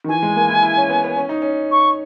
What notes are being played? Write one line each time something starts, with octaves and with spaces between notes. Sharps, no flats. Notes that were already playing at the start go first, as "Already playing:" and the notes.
D#3
E3 G#5
G#3
A#3
E4
E4
C#4
B3
B3
C#4
D#4
C#4
C#6